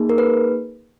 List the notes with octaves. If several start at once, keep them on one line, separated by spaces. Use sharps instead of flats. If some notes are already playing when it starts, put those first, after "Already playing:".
Already playing: A#3 D#4 G#4
A#4
B4